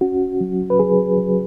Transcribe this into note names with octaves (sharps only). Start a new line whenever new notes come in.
C#4 F#4
F#3
B4
F#3 G#4
F#3